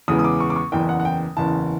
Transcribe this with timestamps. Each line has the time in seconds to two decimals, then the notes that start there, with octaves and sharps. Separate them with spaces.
0.08 E2 C#3 E3 G#3 B3 D#6
0.19 D#6
0.24 D6
0.40 C#6
0.50 D6
0.56 C#6
0.72 F#1 E2 C#3 E3 G5
0.89 F#5
1.00 F#5
1.05 G5
1.37 F#1 E2 C#3 E3 A5